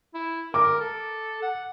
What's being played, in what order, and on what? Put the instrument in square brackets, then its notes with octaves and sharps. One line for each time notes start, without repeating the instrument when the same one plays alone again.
[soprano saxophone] E4
[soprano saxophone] A#4 [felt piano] D6
[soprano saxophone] A4
F#5